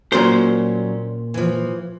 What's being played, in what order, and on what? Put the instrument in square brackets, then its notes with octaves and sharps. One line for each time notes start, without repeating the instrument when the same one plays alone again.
[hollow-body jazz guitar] A#2 C5 [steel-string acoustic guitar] F#3 G3 C#4
[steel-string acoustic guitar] E3 F3